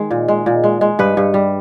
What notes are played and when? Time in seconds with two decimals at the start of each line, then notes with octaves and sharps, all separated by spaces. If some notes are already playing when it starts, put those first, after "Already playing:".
Already playing: D#3 G#3
0.11 A#2
0.28 G#3
0.46 A#2
0.64 G#3
0.81 G#3
0.99 G2 B4
1.17 G2
1.34 G3